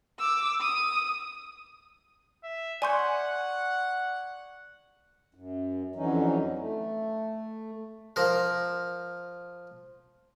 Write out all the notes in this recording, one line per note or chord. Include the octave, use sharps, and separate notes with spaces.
D6 E6
D#6
E5
D5 F#5 G#5 C6 C#6 G6
F#2
F2 D3 E3 F#3 C#4 D#4
A3
F3 A#4